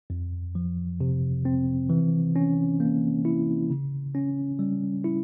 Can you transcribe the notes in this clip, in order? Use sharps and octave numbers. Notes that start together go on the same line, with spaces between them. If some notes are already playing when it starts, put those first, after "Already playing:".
F2
F3
C3
C4
E3
C#4
A#3
E4
C#3
C#4
G3
E4